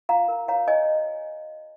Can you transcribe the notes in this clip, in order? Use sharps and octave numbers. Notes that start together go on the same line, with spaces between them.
F4 F5 A#5
A#4
C#5 F5 A#5
C#5 D#5 G#5